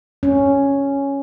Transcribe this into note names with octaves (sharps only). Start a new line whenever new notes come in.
C#4